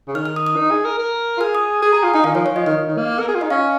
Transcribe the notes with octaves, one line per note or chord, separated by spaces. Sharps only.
C#3
D#3 F6
F6
D#6
D#6
D#4
G#4
A#4
A#4
F4
G#4 F6
D#6
G#4 D#6
G#4 A#5
F4
D#4 G#5
D#3 F5
F3 C#5
C#5
F3 D#5
D#3 D#5
D#3
A#3
A#4
G#4
F4
D#4 D#5
C#4 F5